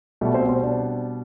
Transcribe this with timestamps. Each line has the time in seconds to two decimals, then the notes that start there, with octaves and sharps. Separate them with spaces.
0.21 B2 G3 A3 A4
0.34 C4 C5
0.48 C4 C5
0.63 D4 D5